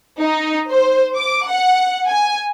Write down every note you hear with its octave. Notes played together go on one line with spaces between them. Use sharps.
D#4
C5
D6
F#5
G#5